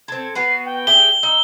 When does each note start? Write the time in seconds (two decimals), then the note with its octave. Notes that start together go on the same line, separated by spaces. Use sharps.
0.08 C4 A4 G#6
0.35 B3 F#4 B4 C7
0.65 G5
0.87 G4 G#4 E5 G7
1.23 D#4 E6